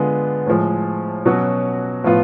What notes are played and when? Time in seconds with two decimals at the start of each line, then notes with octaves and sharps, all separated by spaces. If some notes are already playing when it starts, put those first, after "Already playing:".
Already playing: D3 G#3 B3 F4
0.46 A2 F3 G#3
1.25 B2 F#3 C#4 F#4
2.04 A2 F3 B3 F4